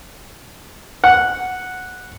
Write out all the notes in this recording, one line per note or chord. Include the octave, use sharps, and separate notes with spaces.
F#5